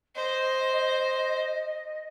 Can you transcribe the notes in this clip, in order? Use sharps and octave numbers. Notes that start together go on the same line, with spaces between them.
C5 D#5